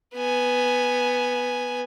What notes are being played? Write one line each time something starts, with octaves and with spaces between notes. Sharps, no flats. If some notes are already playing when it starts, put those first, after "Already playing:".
B3 G#5